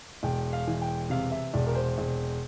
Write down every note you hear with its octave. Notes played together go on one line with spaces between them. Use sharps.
E1 G5
F5
E3
G5
C3 F5
E5
E1 D5
A#4
C5
E1